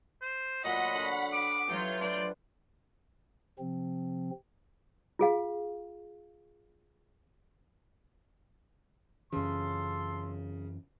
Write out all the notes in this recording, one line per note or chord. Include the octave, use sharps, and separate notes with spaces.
C5
A#2 F#3 D#5 F#5 B5
D3 F#4 A5
D#5 G5 D6
F#3 E4 F4 G4 B4 G6
D4 B4 C5 D5
C3 F3 C4
F4 G#4 F5
F#2 C#3 E3 A4 C6